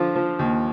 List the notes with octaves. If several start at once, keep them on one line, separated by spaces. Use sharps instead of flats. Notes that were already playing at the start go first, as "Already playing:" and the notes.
Already playing: D3 F3 F4
F3
D#2